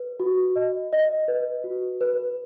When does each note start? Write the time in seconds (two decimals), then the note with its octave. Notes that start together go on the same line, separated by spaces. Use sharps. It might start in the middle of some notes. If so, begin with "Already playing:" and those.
Already playing: B4
0.20 F#4
0.56 D#5
0.93 D#5
1.28 B4
1.64 F#4
2.01 B4